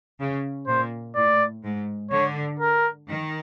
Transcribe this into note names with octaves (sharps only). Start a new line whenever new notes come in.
C#3
A#2 C5
A2 D5
G#2
D3 C#5
A#4
D#3